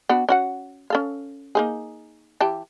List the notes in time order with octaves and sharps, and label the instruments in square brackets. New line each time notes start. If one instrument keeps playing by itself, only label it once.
[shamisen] B3 D4 F#4
C#4 F#4 F#5
C#4 A4 F5
A#3 D#4 G#4
E3 G4 A5